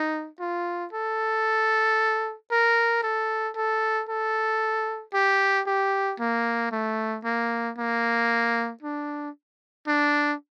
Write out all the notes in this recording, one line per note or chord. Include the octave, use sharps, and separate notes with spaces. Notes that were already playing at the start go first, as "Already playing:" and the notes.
Already playing: D#4
F4
A4
A#4
A4
A4
A4
G4
G4
A#3
A3
A#3
A#3
D4
D4